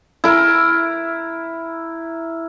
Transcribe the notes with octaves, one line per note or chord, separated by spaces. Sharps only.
E4 A#4